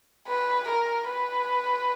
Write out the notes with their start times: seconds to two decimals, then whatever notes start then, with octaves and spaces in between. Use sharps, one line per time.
0.28 B4
0.68 A#4
1.09 B4